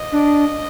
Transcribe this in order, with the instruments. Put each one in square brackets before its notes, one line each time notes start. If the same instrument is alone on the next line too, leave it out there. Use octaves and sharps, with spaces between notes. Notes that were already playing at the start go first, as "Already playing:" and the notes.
Already playing: [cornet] D#5
[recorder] D4